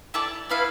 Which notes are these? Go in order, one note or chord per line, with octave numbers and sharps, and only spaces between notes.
E4 A4 D5 A5
B3 E4 B4 F5